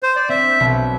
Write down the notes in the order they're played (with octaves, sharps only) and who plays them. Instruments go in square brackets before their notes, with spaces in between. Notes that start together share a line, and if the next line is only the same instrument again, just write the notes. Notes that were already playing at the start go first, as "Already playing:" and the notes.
[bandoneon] C5
D5
[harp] C4 [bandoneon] E5
[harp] B1